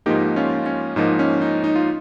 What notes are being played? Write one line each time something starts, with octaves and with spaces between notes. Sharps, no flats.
G#2 F3 A#3 D#4 G4
C#4 F4
C#4
G#2 F3 A#3 D#4
C#4
D#4
D#4
F4